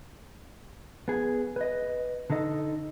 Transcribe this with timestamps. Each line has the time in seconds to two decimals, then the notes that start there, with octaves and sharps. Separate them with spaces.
1.08 B3 G#4
1.56 B4 D#5
2.30 D3 D#4 A4 D#5